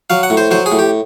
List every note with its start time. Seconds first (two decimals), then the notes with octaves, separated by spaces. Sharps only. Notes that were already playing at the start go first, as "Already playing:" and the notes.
0.10 F#3 F5
0.23 F#5
0.30 A2
0.37 C5
0.51 F#3 C5
0.66 G#4
0.72 A2
0.79 G4